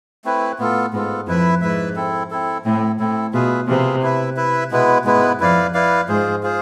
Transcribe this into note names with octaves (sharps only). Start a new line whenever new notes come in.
A3 C4 E4 B4
A2 B3 F4 A4
G#2 B3 F4 A4
F2 E4 B4 E5
G#2 E4 B4 E5
C4 E4 A4
C4 E4 A4
A2 C4 E4 A4
A2 C4 E4 A4
B2 F4 G#4 B4 E5
C3 F4 G#4 B4 E5
E4 B4 E5
E4 B4 E5
B2 G#3 B3 E4 B4
G#2 G#3 B3 E4 B4
F2 E4 B4 D5 F5
E4 B4 D5 F5
G#2 F4 G#4 C5
F4 G#4 C5